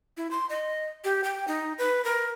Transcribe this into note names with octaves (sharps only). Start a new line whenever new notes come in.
E4
C6
D#5
G4
G5
D#4
B4
A#4